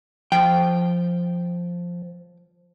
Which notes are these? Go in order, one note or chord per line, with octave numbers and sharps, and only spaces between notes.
F3 G5